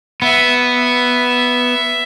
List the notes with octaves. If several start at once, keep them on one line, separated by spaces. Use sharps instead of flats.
B3 E5
E5